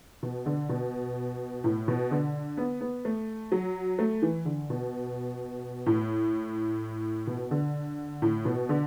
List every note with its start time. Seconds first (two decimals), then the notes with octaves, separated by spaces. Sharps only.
0.23 B2
0.46 D3
0.69 B2
1.64 A2
1.88 B2
2.11 D3
2.57 B3
2.81 B3
3.05 A3
3.52 F#3
3.99 A3
4.22 E3
4.45 D3
4.70 B2
5.86 A2
7.27 B2
7.51 D3
8.22 A2
8.45 B2
8.69 D3